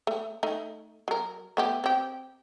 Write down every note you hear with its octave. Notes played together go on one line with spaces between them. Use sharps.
A3
A3 D#4
F#3 A#4
A3 B3 G4
C4 G4